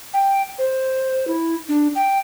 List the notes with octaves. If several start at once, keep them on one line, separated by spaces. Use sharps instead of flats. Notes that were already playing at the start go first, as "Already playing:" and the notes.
G5
C5
E4
D4
G5